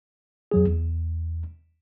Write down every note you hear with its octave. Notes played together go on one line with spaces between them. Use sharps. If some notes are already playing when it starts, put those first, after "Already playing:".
F2 F#3 G#4
E2